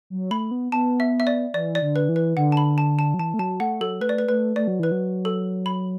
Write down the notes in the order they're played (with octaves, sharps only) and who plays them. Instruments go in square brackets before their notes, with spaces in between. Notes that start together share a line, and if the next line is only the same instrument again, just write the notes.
[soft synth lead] F#3
[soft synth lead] A3 [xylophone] B5
[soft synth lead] B3
[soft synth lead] B3 [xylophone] A5
[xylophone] E5
E5
D5
[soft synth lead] E3 [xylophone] D5
[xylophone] D5
[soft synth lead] D3
[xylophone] B4
[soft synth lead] E3
[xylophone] B4
[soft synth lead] D3 [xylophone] F#5
[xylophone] A5
B5
A5
A5
[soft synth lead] F#3
[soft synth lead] E3 [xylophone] A5
[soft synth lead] A3
[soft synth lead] F#3 [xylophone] A5
[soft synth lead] A3 [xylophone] F#5
[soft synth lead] F#3 [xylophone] A4
[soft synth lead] A3 [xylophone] B4
[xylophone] D5
B4
[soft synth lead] A3 [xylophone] B4
[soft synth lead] A3 [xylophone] D5
[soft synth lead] F#3
[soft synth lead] E3 [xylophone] B4
[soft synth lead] F#3
[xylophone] A4
B5